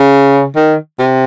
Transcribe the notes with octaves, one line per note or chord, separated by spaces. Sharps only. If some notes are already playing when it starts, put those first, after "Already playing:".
Already playing: C#3
D#3
C3